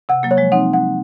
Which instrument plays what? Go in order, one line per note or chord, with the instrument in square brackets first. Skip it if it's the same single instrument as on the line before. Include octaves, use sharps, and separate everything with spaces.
[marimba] C3 [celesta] F#5
[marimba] F#3 A#3
[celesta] C#5
[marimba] F3 G#3
[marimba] C4 D#4 [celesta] F#5
[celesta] F#5